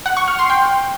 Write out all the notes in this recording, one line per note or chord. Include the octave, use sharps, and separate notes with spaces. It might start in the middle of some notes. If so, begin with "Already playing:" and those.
F#5
C#6
F6
C6
G5